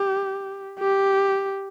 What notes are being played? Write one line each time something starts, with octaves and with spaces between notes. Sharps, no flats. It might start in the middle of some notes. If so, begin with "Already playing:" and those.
Already playing: G4
G4